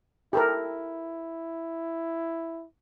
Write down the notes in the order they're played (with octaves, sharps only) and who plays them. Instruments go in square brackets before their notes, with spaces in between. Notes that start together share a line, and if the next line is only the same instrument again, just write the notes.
[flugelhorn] E4 [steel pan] G4 A4 A#4